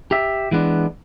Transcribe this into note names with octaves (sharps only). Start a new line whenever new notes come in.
G4 E5
E3 G#3 B3 D4